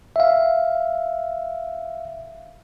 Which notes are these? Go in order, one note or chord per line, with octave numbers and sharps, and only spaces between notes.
E5 F5